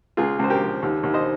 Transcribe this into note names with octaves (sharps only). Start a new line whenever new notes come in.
C#2 F4 G#4
C#2 C5
G4 A#4
F3
D#2
D#2
C5 D#5